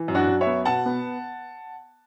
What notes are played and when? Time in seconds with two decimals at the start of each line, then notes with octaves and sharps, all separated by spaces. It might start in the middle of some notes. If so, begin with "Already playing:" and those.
Already playing: E3
0.08 F#2
0.15 D4 F#4
0.27 F#2
0.41 C#5 E5
0.46 B3
0.65 B2 F#5 A5
0.86 B3